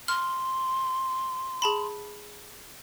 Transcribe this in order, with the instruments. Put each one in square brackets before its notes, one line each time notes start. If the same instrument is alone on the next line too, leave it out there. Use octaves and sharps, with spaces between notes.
[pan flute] C6 [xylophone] F6
[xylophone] G#4 A5 B5